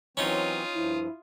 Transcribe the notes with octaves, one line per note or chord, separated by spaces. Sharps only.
E3 F#3 C4 C#4 D#4 F4 D#6
G2 F3 E4